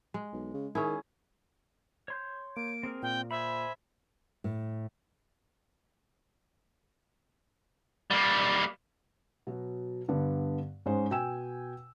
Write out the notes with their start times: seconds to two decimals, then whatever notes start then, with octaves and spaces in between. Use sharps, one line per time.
0.14 G#3
0.33 B1
0.54 C#3
0.75 D#3 C#4 E4 G#4
2.08 C#5 C6 G6
2.56 A#3 D7
2.83 C4 G#4 A#4
3.02 A#2 G5
3.31 G#4 C5 E5 B5
4.44 A2
8.11 G3 A#3
9.47 B2 F#3
10.08 G2 D3 B3
10.86 G#2 G#3 C#4 C5
11.11 B2 G5 G#5 E6 E7